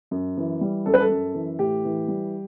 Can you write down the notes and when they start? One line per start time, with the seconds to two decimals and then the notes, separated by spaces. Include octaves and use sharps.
0.11 F#2
0.37 E3
0.61 G3
0.86 F#2 A4
0.94 B4
1.00 A4
1.10 F#2
1.35 E3
1.59 A2 G4
1.85 E3
2.08 G3